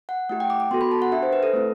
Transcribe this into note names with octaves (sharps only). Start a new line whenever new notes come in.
F#5
A3 E4 G4 F#5
G5
D6
D6
B3 F#4 A4 C6
B5
A5
F#5
D4 G4 E5
C5
B4
A4
A3 C4 E4